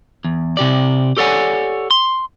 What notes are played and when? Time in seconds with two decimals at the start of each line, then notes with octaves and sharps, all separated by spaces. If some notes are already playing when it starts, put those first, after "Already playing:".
0.24 E2
0.57 C3 G4 D5
1.17 G4 A4 C#5 D5 F#5 G#5
1.91 C6